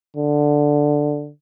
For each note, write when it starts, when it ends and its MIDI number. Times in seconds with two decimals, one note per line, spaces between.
0.17 1.30 50